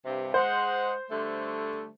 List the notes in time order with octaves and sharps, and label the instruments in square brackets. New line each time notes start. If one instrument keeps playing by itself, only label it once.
[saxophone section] G2 C3
[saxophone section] G#3 F#5 [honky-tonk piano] C5
[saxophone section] D3 G3 A3